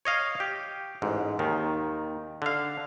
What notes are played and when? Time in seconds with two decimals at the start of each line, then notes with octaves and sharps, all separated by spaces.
0.05 C#5 D#5 F5
0.40 G4
1.02 A1 G#2
1.39 D#2 D#3
2.42 D3 F5